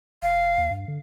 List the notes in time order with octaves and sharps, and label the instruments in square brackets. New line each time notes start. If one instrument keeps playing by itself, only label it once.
[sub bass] F1 [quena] F5
[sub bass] D#2
G2
D3